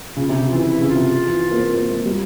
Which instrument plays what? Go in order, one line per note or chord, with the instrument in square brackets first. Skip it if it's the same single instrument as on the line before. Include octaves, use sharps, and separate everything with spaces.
[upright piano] C#3 [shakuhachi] F4
[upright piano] C3 [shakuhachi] G4
[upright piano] C#3
[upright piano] E3 [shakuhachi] F4
[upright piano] E3 [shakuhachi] E4
[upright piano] C#3
[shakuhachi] F4
[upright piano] C3
E3
A#3
C4
A#3
G#3
[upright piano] G3 [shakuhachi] F4